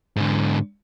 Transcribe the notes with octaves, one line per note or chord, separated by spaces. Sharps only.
G#2 D3